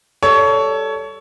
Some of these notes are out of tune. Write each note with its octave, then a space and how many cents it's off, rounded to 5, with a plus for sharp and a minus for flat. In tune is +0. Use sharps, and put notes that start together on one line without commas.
G3 +0 A4 +0 C#5 +20